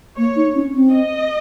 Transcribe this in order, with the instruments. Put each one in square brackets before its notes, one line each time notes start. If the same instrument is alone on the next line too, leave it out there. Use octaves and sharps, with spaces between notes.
[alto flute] A#3 [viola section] C#5
[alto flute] D#4
C#4
C4
[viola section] D#5